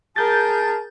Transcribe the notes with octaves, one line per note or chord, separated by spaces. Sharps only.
G#4 A#4 A5 G6 A6